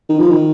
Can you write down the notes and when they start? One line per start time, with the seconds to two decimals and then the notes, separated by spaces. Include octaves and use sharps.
0.09 D#3
0.18 F3
0.29 D#3